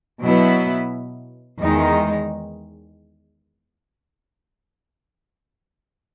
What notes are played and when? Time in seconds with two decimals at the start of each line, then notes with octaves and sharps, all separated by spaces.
0.22 B2 F#3 B3 E4
1.61 E2 D#3 G#3 D#4